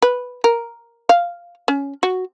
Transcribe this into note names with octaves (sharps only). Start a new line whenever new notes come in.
B4
A#4
F5
C#4
F#4